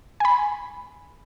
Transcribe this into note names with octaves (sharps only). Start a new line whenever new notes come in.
G#5 B5